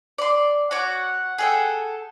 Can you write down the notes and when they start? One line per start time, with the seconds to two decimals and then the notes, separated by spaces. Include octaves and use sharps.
0.18 D5 C6
0.71 F#4 C#5 F#5 D6
1.38 G#4 A4 G5